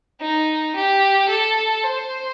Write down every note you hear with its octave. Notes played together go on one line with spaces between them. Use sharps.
D#4
G4
A4
C5